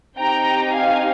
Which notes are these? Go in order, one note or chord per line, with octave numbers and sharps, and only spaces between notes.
C4 D#4 G4 G5 A#5
F5 G#5